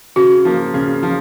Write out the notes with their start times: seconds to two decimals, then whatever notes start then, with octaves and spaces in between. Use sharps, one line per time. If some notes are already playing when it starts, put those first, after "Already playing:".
0.16 C#3 F#4
0.45 F3 A#3
0.74 C#3
1.03 F3